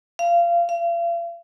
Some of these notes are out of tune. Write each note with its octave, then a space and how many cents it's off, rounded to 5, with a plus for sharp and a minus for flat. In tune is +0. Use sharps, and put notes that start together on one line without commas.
F5 -25
F5 -40